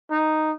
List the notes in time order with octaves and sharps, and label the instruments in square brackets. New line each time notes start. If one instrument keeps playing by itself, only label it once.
[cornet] D#4